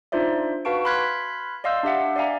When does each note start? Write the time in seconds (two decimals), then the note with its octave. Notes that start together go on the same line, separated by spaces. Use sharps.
0.12 D4 D#4 F4 C5 D5 E5
0.65 F#4 B4 F5 A5 C#6 D7
0.85 B5 C6 F6 F#6 G#6 B6
1.64 D5 D#5 F5 C6 E6 G6
1.83 D4 G4 E5 F#5
2.16 D5 E5 F5 G#5 A#5